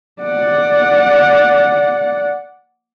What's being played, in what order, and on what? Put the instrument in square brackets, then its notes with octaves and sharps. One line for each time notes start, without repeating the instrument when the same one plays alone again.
[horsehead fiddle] D5 F#5